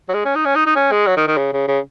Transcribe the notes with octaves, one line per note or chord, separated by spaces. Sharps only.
F#3
G#3
C#4
D#4
C#4
D#4
D#4
C#4
G#3
F#3
D#3
D#3
C#3
C#3
C#3